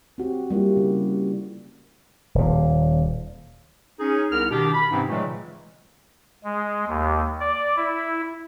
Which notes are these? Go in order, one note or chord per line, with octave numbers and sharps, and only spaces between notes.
C4 F#4 G4
G3 A#3 E4 F4
C#3
D#1 A#2
C#4 D#4 G#4
C2 B3 A#4 F6
B2 D#3 D4 G4
B5
G#2 C3 E3 C4 C#4 D#4
A#2 C#3 E3 F#3 G#3 A3
G#3
D#2
D5
E4